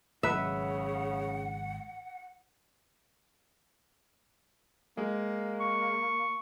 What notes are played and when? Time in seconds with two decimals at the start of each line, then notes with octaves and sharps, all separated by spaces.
0.23 G#1 C#3 F#3 B4 E5 F#5
4.97 G#3 A#3
5.60 C#6